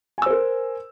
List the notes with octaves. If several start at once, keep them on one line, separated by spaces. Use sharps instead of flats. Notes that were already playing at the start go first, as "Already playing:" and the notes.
A#4 C5 G#5 E6